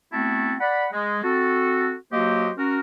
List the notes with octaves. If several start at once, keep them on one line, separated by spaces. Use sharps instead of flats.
A3 B3 C4 E4 F#4 A5
D5 F#5 B5
G#3
C4 F#4 A4
F#3 A#3 F#4 G4 C5 D#5
C#4 F#4 A#4